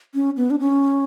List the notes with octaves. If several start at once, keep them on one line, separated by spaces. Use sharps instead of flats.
C#4
B3
D4
C#4